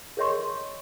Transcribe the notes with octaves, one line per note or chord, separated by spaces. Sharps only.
G#4 A#4 C#5 D#5 C6 C#6